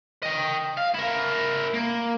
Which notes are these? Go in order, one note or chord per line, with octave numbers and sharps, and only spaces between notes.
D#5 G5
F5
E4 A#4
A#3